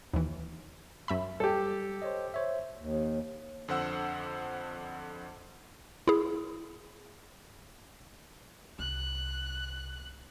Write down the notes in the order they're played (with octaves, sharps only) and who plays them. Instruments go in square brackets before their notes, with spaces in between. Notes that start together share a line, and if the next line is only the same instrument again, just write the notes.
[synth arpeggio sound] D#2 E3
F#2 E5 B5
[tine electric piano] G3 [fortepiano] G4 A4
[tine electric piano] C5 C#5 D#5
C5 C#5 E5
[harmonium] D#2
[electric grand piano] F2 D3 C5 F#5 E6
[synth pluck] E4 G#4
[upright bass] C2 [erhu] F#6